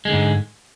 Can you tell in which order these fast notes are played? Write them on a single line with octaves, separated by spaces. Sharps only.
G#3 D3 G#2